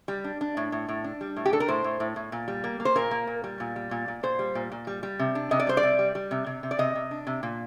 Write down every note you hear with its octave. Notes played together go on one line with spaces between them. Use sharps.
G3
D4
D4
A2
A2
A2
D4
G3
A2
G4
D4 A4
A#4
A2 C5
A2
A2
A2
A#2
G3
A#3
A#3
C5
A#2 A#4
A#3
A#2
G3
A#2
G3
A#2
A#2
A#2 C5
G3
A#2
A#2
G3
G3
C3
D4
C3 D#5
D5
G3 C5
D5
C3
G3
G3
C3
C3
C3
D5
C3 D#5
C3
D4
C3
A#2